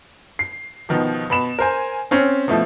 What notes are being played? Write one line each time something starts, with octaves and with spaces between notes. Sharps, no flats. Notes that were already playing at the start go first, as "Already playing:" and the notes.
C7
B2 D#3 F3
B2 B5 E7
A#4 C5 G#5
C4 C#4
B2 F3 A3 E4